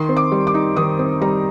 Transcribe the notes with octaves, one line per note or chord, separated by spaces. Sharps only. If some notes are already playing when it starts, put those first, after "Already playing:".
Already playing: D#3 C6
C4
D6
G3
D6
D#4
D#3 D#6
C4
G3 A#5